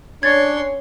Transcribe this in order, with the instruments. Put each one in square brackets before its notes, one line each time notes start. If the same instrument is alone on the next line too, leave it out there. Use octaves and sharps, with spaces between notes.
[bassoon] C#4 [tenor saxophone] D4 [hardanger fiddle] C#5 C6 [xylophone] G#6 A6